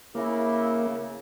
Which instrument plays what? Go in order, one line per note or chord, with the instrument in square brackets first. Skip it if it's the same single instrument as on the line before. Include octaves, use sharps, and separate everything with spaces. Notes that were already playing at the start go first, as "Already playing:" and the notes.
[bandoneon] C#3 [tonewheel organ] A#3 [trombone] E4